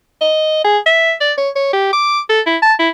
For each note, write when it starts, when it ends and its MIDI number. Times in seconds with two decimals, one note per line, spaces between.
0.21 0.60 75
0.64 0.78 68
0.86 1.14 76
1.21 1.33 74
1.38 1.49 73
1.56 1.68 73
1.73 1.89 67
1.93 2.20 86
2.29 2.41 69
2.47 2.57 64
2.62 2.74 81
2.79 2.89 64